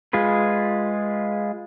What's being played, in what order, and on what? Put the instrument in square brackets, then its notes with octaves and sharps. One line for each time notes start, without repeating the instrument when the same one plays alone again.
[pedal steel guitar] G#3 F4 G#4 B4